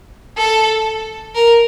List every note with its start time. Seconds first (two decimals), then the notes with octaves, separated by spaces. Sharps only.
0.37 A4
1.35 A#4